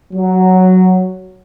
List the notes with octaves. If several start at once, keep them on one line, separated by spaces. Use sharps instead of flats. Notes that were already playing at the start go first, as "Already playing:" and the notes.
F#3